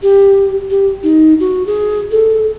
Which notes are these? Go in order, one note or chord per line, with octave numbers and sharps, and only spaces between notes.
G4
G4
D#4
F#4
G#4
A4